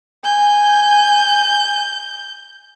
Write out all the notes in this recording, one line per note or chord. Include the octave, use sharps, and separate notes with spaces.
G#5 G6